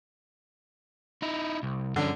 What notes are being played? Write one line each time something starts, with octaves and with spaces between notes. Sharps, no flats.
D#4 E4
C2
G2 D3 C#4